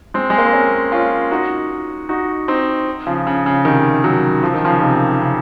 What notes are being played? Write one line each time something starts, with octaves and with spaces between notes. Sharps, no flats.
G#3 C4
G#3
A#3
C4
A#3 C#4
C#4 F4
D#4 F#4
D#4 F#4
C4 D#4
C#3 F3
C#3
C#3
C3 D#3
D#3 F#3
F3
D#3
C#3 F3
C3 D#3
C#3